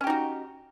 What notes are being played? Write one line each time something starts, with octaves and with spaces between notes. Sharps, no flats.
C#4 D#4 F#4 G4